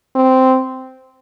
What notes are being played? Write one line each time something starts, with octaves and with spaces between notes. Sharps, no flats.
C4